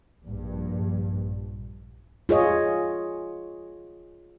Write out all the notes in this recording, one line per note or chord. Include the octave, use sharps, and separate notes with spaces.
A#1 G2
F4 G#4 C#5 D#5